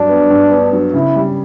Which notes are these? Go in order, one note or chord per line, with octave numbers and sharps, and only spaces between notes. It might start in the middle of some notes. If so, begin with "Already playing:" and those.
Already playing: G2 F#3 D4
B3
G2
B3
F#3
C#3 E4
G3